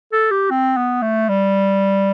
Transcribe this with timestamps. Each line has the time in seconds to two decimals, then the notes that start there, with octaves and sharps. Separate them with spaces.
0.12 A4
0.31 G4
0.50 C4
0.77 B3
1.02 A3
1.29 G3